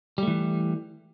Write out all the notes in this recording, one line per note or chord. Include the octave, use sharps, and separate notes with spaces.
E3 G3 A3